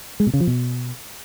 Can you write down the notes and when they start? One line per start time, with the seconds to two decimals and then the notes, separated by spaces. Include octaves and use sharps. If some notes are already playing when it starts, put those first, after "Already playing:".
0.20 G#3
0.27 B2
0.34 C#3
0.40 F3
0.47 B2